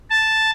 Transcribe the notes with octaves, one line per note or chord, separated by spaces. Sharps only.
A5